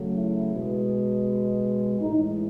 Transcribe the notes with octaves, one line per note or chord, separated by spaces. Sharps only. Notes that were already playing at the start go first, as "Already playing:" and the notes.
Already playing: C#3 F#3 A3
E4
B2 G#3
A2 E3 G#3 D#4